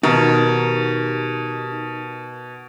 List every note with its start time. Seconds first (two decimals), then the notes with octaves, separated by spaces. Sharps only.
0.03 B2 D#3 D#4 G4 A#5